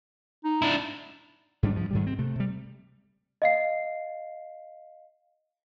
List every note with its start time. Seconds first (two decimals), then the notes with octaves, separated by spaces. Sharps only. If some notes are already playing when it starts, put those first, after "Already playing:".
0.44 D#4
0.62 D4 E4
1.63 G#2 G3 D4
1.75 G2 F3
1.91 G#2 D#3 G3
2.07 C4
2.19 C3 A3
2.36 C3 G3
3.42 D#5 F5 C7